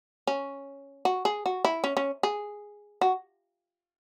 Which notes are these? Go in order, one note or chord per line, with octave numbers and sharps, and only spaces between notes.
C#4
F#4
G#4
F#4
E4
C#4
C#4
G#4
F#4